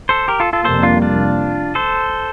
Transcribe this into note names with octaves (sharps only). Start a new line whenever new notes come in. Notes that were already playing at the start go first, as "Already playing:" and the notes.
A4 C5
G4 A#4
F4 A4
F4 A4
F2 C3 G3 A#3 A4 C5
D4 F4
D4 F4
A4 C5